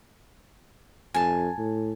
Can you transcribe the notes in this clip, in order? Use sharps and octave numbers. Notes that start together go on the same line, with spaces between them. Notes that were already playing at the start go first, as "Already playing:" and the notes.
F2 G#5 A5
A2